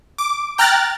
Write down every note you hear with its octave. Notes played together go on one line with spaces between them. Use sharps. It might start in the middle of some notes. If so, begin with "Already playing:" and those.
D6
G5 A#5 F6 F#6 A6